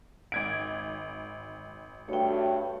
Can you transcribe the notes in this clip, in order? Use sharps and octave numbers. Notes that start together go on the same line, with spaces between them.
G#1 G#6 D7
G2 A3 F#4 C#5 G5